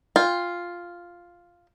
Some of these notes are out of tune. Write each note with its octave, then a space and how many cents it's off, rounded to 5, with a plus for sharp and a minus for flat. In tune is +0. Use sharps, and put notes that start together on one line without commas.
F4 +0 G5 +30